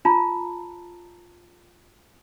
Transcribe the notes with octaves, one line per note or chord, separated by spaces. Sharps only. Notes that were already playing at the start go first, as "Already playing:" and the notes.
F4 A5 A#5